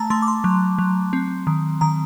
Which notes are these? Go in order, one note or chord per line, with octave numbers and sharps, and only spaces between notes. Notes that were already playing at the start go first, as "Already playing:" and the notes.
Already playing: A3 A5 A#5
A3 C6
D6
C6
F#3
F#3
C4
D#3
D#3 A#5